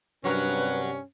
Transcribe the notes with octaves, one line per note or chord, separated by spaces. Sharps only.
G2 C3 F#3 C#4 F#4 A#4 B4